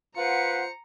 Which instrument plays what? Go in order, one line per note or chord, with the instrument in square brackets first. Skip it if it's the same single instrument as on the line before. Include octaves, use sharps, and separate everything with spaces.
[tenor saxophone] F4 [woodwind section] B4 F#5 [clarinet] C5 [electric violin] A#5 C#7